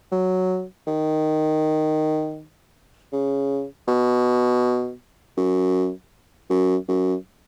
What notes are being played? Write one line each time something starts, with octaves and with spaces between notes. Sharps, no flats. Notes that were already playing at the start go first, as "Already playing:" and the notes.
F#3
D#3
C#3
B2
F#2
F#2
F#2